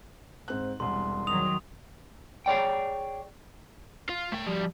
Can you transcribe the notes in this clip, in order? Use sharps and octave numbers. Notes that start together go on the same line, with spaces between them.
G#2 C4 F#6
E1 C2 C6
D#3 F#3 D#6 F7
G#4 C#5 D5 G5
F4
A3 G5
F3 G3